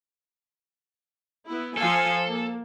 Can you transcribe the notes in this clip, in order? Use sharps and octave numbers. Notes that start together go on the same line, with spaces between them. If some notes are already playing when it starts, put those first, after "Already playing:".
B3 E4
F3 A4 F5 G#5
A#3